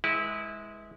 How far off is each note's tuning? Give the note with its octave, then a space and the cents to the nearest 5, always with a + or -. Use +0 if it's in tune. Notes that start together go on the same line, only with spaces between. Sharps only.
G#3 +0 E4 -20 B4 -25